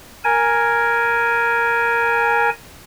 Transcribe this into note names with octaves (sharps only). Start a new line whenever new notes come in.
A#4 G#5